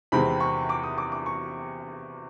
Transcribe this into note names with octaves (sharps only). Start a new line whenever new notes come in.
E2 C3 D#3 G#3 C4 B5
C#6
D6
D#6
D6
D6
C#6